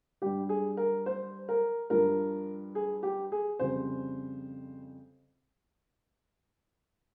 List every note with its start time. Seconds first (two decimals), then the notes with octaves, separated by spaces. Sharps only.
0.22 G2 G3 G4
0.49 G#4
0.77 A#4
1.06 C5
1.49 A#4
1.90 G2 F3 A#4
2.75 G#4
3.03 G4
3.32 G#4
3.59 F2 C#3 G3 C5